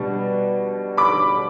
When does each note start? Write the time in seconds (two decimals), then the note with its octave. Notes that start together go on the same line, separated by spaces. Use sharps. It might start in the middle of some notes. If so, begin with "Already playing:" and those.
Already playing: B2 G3 B3 D4
0.98 B5 D6